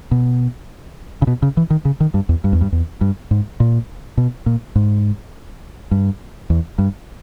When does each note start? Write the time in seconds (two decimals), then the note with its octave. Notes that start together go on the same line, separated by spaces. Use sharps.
0.11 B2
1.22 C#3
1.27 B2
1.42 C#3
1.57 E3
1.70 D#3
1.85 C#3
2.00 D#3
2.14 G2
2.29 E2
2.44 G2
2.53 E2
2.61 G2
2.72 E2
3.01 G2
3.31 G#2
3.60 A#2
4.17 B2
4.46 A#2
4.76 G#2
5.91 G2
6.50 E2
6.78 G2